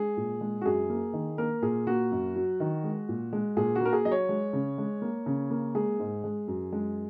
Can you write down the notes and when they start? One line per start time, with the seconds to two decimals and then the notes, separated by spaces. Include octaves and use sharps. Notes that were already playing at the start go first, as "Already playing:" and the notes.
Already playing: G#3 G#4
0.17 A#2
0.41 G#3
0.61 F#4
0.66 F#2 G#4
0.90 A#3
1.13 D#3
1.38 A#3 A#4
1.62 A#2 G#4
1.87 A#3 F#4
2.12 F#2
2.35 F#3
2.60 D#3
2.84 G#3
3.09 A#2
3.33 G#3
3.57 A#2 G#4
3.75 F#4
3.81 A#3 A#4
3.93 G#4
4.05 F#3 D#5
4.12 C#5
4.29 G#3
4.53 C#3
4.78 G#3
5.02 A#3
5.26 C#3
5.51 A#3
5.75 G#3 G#4
6.00 G#2
6.24 G#3
6.48 F#2
6.72 G#3